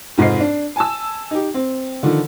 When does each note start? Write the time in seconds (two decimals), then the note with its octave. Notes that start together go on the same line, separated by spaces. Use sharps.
0.18 F1 G#2 F4 C5 D#5 C7
0.40 D4
0.76 G#5 A5 E6
1.31 D#4 G4
1.54 C4
2.03 D3 D#3 F3